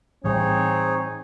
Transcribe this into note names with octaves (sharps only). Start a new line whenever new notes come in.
A2 E3 G3 C4 D#4 G#4 C#5